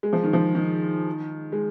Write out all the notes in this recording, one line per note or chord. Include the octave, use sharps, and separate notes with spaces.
G#3
F3
D#3
F3
D#3
G#3